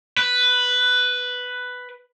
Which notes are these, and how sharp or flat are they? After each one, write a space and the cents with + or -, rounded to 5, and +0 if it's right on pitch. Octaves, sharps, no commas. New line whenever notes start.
B4 +5